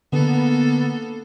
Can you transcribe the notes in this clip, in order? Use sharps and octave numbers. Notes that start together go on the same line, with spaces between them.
D3 A#3 B3 A4